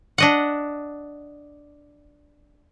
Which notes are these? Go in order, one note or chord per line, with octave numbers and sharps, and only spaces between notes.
D4 D#5 F#5